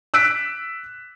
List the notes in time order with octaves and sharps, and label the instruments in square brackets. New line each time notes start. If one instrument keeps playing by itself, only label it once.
[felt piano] E6 F#6 B6 D7